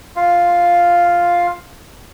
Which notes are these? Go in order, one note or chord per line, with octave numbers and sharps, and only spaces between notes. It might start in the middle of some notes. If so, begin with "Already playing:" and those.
F4 F5